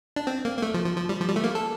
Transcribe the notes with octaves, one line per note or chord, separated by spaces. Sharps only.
D4
C4
A#3
A#3
A3
F3
F3
F3
G3
F3
G3
A3
A#3
A4